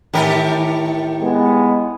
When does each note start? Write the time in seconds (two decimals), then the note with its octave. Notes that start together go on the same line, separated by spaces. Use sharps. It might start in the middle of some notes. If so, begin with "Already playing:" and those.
0.14 A2 D#3 G4 A#4
1.22 G#3 B3